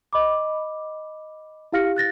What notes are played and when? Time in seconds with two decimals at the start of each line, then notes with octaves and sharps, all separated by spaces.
0.13 D#5 B5 D6
1.72 E4 G4 F5 F6 A#6 C#7
1.96 F#6 A6 A#6